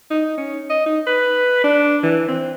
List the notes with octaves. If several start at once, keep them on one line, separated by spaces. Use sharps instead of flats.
D#4
C#4
D#5
D#4
B4
D4
E3
C4